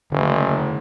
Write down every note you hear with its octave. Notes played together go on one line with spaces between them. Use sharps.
F#1 D3 D#3 A3